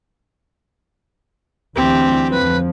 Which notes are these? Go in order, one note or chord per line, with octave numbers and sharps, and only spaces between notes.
D2 E3 G3 C4 G4
F2 F3 B4